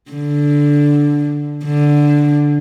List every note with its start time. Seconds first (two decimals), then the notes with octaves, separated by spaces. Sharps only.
0.11 D3
1.65 D3